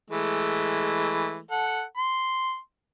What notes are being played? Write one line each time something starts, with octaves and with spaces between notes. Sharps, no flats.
E3 G#3 A3
A4 F#5
C6